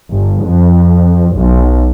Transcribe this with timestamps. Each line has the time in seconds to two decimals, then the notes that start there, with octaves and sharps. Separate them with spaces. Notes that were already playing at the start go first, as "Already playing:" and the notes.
0.11 G1
0.45 F2
1.35 B1